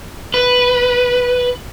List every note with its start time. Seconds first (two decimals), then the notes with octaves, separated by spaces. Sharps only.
0.34 B4